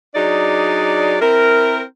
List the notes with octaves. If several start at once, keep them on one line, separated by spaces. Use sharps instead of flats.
F#3 D4 D#4 G#4 D5
C4 E4 A#4